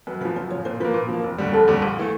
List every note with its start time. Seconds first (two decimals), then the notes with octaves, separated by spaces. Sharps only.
0.07 F#2 B4
0.21 C#3 B4
0.25 F3
0.36 F#2 C5
0.50 F3 C#5
0.55 C#3
0.65 A#2 C5
0.80 F3 A#3 B4
0.94 A#2
1.09 F3 A#3
1.24 F1
1.38 D#2 D3 G3
1.53 F1 A4
1.68 D#2 D3 G3
1.82 A#1
1.99 E3 A3